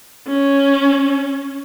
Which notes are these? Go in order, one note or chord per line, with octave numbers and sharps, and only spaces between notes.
C#4